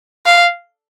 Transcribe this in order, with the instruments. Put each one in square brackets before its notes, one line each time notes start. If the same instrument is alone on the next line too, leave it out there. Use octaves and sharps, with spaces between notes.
[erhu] F5